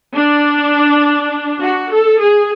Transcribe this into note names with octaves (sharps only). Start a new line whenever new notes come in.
D4
F#4
A4
G#4